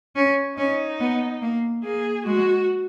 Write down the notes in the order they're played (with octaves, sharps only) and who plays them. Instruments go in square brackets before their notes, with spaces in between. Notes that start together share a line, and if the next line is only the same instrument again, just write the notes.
[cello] C#4
[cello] C#4 [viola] D#4
[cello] B3
A#3
[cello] A#3 [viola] G#4
[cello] G#3 [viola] F#4